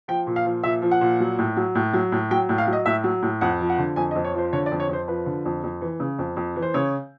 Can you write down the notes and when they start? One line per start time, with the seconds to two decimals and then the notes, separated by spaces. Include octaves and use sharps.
0.08 F3 G5
0.27 A#2
0.36 F5
0.45 F3
0.63 A#2 E5
0.82 F3
0.91 F#5
1.01 A#2
1.20 F#3
1.38 A2
1.57 F#3
1.75 A2
1.93 F#3
2.12 A2
2.31 F#3 G5
2.49 A2
2.58 F5
2.67 F#3
2.73 D#5
2.86 A2 E5
3.04 F#3
3.22 A2
3.41 F2 F#5
3.60 F3
3.70 F#5
3.78 D3
3.96 F2 G#5
4.11 D#5
4.15 F2
4.24 C#5
4.34 F3 C5
4.53 D3 C#5
4.66 D5
4.71 F2
4.80 C#5
4.89 F2 C5
5.08 F3 B4
5.26 D3
5.45 F2
5.64 F2
5.81 E3
6.00 C#3
6.19 F2
6.37 F2
6.56 E3
6.62 C5
6.74 C#3 C#5